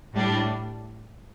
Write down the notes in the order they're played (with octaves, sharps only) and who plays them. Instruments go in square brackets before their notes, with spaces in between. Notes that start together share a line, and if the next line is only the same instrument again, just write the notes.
[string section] A2 G3 D4